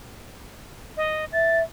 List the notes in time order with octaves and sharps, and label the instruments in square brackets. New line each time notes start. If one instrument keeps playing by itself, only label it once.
[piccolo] D#5
[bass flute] E5 [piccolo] A6